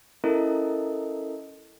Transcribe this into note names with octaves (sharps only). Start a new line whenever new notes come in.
C#4 E4 A4 A#4 D#5